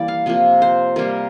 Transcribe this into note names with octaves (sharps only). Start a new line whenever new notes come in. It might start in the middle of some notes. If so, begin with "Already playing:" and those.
Already playing: E3 G3 A#3 D5
F5
C3 F3 A#3
C5
C3 G3 A#3 A#4